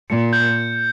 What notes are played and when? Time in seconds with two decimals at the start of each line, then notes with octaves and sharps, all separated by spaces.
0.09 A#2 C#7
0.33 G6